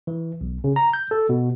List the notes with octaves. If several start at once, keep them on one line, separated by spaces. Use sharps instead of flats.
E3
B1
C#3
A#5
G6
A4
B2